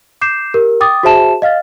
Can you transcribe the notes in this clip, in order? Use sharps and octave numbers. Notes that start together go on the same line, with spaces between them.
D6 G6 C7 E7
G4 A#4
G5 D6 D#6 A6
F#4 G#4 C5 E5 A5 E7
D#5 F5 F6 A6